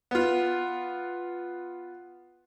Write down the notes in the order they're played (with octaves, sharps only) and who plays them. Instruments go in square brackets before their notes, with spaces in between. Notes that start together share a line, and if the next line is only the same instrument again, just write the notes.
[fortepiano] B3 F4